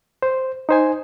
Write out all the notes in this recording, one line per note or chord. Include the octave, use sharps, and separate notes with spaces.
C5
D#4 C5 G#5